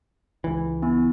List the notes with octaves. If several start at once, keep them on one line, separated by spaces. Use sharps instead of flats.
C#2 E3
B3 E4 G#5